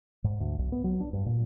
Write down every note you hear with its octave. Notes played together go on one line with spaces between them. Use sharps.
G#2
D2
B1
B3
F#3
D4
G2
A#2